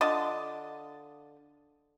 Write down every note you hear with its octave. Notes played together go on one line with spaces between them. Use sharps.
D3 F4 D#5 A5